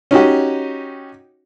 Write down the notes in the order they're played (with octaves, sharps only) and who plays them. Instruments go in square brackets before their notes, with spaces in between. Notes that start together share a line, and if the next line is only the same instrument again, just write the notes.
[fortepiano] C#4 D#4 F#4 G4